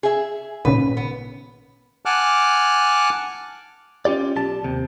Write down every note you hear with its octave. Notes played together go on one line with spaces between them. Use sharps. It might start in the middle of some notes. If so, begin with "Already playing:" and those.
G#4 E5
G#1 A#2 C#3 B4
B3
F#5 G#5 A5 D6 F6 F#6
C#4 F4 G4 D5
B1 G4 A5
D#2 C3